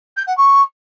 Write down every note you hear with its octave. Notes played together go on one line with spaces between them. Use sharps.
G6
F#5
C#6